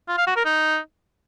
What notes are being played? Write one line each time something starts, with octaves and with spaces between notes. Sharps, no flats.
F4
F5
F#4
A#4
D#4